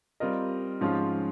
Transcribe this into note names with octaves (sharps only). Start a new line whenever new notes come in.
G3 C4 F4 A#4 D#5
G#2 F3 G#3 C#4 F4